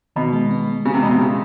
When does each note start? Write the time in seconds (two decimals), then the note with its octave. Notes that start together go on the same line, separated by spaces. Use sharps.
0.16 B2 D#3
0.33 G#3
0.51 B3
0.68 G#3
0.85 C#3 B3
0.94 C3
1.03 B2 G#3
1.11 C3
1.20 C#3 B3